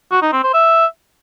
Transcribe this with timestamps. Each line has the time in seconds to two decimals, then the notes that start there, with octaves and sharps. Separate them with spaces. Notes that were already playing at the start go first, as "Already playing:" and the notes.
0.12 F#4
0.22 D#4
0.33 C4
0.43 C5
0.54 E5